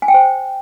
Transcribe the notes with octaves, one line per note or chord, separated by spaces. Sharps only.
G#5
G5
C5